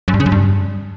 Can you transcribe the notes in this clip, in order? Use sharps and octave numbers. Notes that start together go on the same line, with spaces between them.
F#2
G2
C#3
F#2
G2